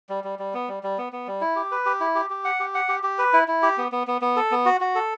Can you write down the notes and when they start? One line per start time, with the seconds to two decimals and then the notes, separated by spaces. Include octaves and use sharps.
0.09 G3
0.24 G3
0.39 G3
0.54 B3
0.68 G3
0.83 G3
0.98 B3
1.13 B3
1.27 G3
1.41 E4
1.56 G4
1.72 B4
1.86 G4
2.00 E4
2.15 G4
2.30 G4
2.44 F#5
2.60 G4
2.75 F#5
2.89 G4
3.03 G4
3.19 B4
3.33 E4
3.48 E4
3.63 G4
3.78 B3
3.92 B3
4.07 B3
4.21 B3
4.36 A4
4.51 B3
4.65 F#4
4.81 F#4
4.95 A4